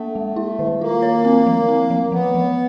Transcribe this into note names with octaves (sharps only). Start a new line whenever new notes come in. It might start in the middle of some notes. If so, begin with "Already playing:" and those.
Already playing: A3 A#3
G#3
E4
D#3
A#3 F4
C#5
C4
F3
C4
F3
F3 B3
F3